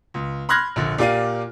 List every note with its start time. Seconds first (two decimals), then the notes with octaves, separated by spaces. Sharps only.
0.14 C#2
0.49 B5 C6 F6 F#6 G#6 A#6
0.76 A#1 D3
0.98 A#2 G4 D5 F5 D#7